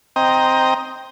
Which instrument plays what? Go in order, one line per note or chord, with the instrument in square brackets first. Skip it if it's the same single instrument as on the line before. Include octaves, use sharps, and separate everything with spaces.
[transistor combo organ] C4 D#5 G5 A#5